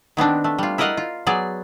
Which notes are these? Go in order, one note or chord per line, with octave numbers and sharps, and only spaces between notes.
D#3 B3 C4 D4
A3
G3 F4
E4 A#4 D5 D#5 F5 F#5
F4
F#3 B3 G#4 D5